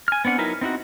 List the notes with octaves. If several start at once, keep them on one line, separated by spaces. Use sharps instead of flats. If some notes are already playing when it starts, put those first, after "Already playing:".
G#5 F6
B3 C4 D4 F#5
F#3 D#4 E4 A#4 B4
C4 D#4 E4 F#4